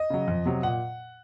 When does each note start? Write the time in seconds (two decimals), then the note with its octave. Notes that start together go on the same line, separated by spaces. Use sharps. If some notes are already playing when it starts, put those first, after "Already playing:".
Already playing: D#5
0.10 C#3 F#3
0.28 F2
0.45 C3 F#3
0.63 A#2 F#5